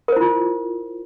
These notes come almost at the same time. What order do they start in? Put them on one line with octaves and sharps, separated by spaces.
A#4 C5 E4 F4